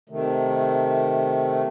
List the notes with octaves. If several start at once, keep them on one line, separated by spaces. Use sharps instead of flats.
C3 D#3 A3